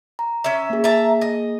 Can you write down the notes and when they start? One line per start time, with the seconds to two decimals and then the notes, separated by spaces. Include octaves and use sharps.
0.19 A#5
0.44 C#4 E5
0.70 A#3 G#4
0.84 E5 A5 A#5
1.22 D#5